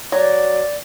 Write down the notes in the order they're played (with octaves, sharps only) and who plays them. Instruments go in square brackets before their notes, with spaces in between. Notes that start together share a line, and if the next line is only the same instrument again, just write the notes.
[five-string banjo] F#3 [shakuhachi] D5